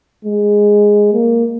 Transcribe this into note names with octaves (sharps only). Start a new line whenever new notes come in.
G#3
A#3